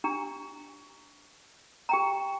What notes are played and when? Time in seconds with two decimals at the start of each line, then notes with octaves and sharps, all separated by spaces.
0.04 D4 G4 A#5
1.89 G4 G5 A#5